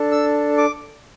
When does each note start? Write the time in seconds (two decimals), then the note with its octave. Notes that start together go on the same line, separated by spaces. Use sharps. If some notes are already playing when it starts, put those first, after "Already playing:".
Already playing: D4 A4
0.11 E6
0.58 D6